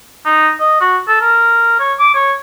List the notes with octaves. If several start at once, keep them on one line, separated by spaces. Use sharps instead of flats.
D#4
D#5
F#4
A4
A#4
C#5
D6
C#5